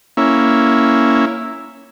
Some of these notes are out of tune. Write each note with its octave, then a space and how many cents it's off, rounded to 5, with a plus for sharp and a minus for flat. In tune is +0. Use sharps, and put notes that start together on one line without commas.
A#3 +0 C#4 +0 E4 +0